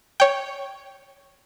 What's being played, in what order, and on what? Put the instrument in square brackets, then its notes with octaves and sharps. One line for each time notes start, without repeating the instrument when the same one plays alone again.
[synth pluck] C#5 G5